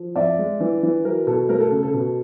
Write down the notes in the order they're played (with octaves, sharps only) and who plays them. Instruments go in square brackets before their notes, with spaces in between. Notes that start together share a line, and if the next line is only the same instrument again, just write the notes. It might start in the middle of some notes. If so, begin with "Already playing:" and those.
Already playing: [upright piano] F3
F2 D5 E5
G#3
E3
E3
F#3 A#4
B2 A4
A3 A#4
A4
C#3
A4
B2